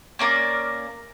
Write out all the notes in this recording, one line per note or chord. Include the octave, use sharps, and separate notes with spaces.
A#3 C#4 A#4 D5